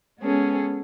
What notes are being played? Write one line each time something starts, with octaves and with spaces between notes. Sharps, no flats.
G#3 B3 C#4 G#4 A4